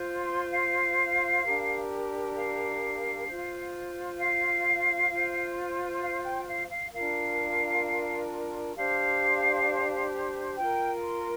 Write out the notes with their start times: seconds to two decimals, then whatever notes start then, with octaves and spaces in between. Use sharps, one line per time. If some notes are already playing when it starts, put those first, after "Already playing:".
Already playing: F4 C5
0.21 C6
0.52 F5
1.43 D4 G4 A#4
2.35 F5
3.26 F4 C5
4.17 F5
5.08 F4 C5
6.00 F5
6.23 G5
6.45 F5
6.68 F5
6.91 D4 F4 A#4 F5
8.74 D4 G4 C5 F5
10.56 F4 A#4 G5
11.02 C6